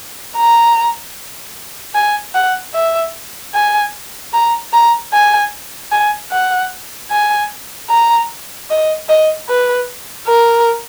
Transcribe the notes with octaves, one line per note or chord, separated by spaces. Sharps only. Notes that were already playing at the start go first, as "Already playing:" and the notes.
A#5
G#5
F#5
E5
G#5
A#5
A#5
G#5
G#5
F#5
G#5
A#5
D#5
D#5
B4
A#4